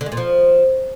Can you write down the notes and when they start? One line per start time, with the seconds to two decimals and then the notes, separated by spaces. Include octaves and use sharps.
0.01 D3
0.06 G#3
0.12 A#2
0.17 F3